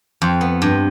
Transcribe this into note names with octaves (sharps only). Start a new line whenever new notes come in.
F2
B3
G2